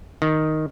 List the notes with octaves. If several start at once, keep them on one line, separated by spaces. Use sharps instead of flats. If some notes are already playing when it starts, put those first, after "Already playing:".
D#3